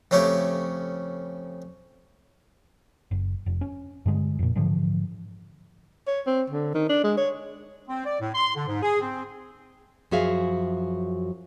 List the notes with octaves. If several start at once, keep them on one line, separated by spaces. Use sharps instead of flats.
F2 C#3 A3 C#4 G4
F#1
F1
C#4
G2 D3 G#3
F2 A#2
G#2 D3 E3 F3
C#5
C4
D3
D#3
D4
G#3
C#5
C4
D5
A2
C6
D3
G#2
G#4
C4
F#2 F3 F#4 G#4 E5 F5